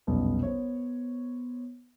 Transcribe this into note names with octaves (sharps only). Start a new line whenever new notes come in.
F1 B1 G3 B3 C#4
B3 C5 C#5